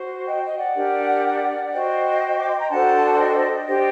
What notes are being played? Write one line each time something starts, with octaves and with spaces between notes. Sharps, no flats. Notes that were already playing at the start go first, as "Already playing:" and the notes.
Already playing: F#4 C5
D#5 G5
D#5
D5 F#5
D4 G4 A#4
F#4 C5 D#5 G5
D6
C6
A#5
D4 F#4 A4 C5 F#5 A5
A5
D#5 G5
D4 G4 C5